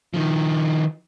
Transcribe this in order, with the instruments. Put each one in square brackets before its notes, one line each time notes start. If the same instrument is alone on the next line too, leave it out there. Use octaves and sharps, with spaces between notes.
[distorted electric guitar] D#3 F3